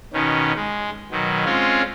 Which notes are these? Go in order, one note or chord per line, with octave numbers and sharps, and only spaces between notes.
B2 D#3 C#4
G#3
B2 D#3 F#3
G#3 C4 C#4 F4 C#5